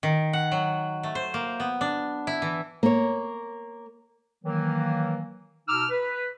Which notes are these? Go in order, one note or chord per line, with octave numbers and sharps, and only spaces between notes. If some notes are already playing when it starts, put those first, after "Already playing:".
D#3
F#5
F#3
A3
C5
A#3
B3
D4
E4
E3
A#3 C#5
D#3 E3 F#3 A#3
B2 D#4 D6 E6 F6
B4